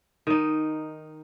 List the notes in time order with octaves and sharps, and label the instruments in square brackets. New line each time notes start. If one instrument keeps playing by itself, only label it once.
[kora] D#3 D#4